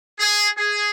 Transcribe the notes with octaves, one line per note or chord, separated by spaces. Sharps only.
G#4
G#4